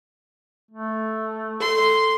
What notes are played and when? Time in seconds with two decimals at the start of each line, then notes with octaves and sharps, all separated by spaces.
0.71 A3
1.61 A4 C6